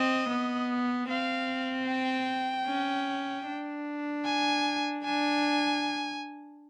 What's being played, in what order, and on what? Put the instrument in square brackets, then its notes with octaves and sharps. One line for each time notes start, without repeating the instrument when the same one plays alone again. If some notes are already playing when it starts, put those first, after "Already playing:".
Already playing: [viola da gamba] C4 [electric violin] D#5
[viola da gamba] B3
[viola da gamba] C4 [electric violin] F5
[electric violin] G5
[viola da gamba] C#4
D4
[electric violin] G#5
[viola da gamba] D4 [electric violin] G#5